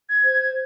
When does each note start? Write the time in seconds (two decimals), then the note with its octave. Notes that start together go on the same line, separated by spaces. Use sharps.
0.09 G#6
0.24 C5